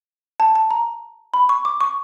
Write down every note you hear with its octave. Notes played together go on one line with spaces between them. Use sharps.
A5
A5
A#5
B5
C#6
D6
C#6